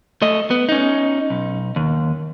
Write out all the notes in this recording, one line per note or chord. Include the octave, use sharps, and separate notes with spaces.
A3 D#5
B3
C#4 D#4
B1
D#2